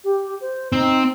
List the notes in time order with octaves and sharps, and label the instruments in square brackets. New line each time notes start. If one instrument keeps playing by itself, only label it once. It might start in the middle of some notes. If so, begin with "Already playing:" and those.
[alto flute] G4
C5
[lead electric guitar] C4 [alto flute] D#4